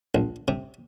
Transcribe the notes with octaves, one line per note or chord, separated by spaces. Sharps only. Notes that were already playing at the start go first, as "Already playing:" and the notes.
A#1
C3